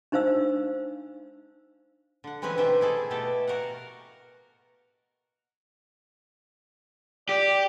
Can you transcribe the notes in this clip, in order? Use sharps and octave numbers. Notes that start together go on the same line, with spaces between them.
D4 D#4 C5 F5 E6
D3 F#5
E3 G#3 C4 C#4 B4 G#5
B2 D#3 G4 C5 E5
E4 G#4 A4
B2 A3 G4 A4
F#4 A#4 F5 F#5
G4 D5